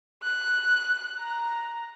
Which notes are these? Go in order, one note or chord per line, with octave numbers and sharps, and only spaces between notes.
F#6
A#5